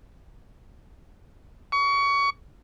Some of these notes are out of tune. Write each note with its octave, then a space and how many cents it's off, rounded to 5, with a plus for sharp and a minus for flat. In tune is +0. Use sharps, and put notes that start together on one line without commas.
C#6 +25